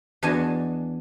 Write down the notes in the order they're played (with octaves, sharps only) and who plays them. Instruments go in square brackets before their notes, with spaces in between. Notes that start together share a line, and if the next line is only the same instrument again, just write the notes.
[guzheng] E2 D4 F#4 D#5 G#5 A5